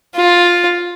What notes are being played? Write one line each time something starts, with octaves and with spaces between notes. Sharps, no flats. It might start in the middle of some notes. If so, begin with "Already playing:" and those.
F4